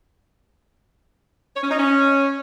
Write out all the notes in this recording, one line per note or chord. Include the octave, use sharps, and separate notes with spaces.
C#5
C#4
D#4
C#4